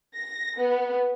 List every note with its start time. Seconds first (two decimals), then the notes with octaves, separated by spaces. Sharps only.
0.14 A#6
0.57 B3